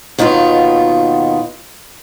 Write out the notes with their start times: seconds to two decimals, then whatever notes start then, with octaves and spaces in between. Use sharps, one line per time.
0.18 D#2 B2 D#3 B3 F4